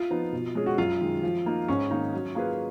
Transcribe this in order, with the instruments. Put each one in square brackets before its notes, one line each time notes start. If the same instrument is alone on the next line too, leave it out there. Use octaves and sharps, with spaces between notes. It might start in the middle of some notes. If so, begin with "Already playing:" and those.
Already playing: [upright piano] F4
[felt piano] F3 B3 D#4
B2
G#3 C#4 G#4
[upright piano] F#4
[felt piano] F#2 [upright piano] F4
[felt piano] D#3 G#3
F3
A#3 D#4
[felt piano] G#2 [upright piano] C#4
[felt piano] D#3 A#3 D#4
F#3
A#3 F4 G#4 B4